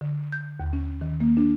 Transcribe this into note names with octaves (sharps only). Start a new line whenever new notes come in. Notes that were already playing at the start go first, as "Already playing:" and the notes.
D3
G6
D#2
C#4
D#3
A#3
D4